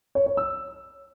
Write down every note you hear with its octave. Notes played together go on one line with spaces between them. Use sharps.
C#5
C#5
E6